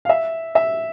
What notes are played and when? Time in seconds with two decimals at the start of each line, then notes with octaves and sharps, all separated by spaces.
0.05 F5
0.09 E5
0.55 E5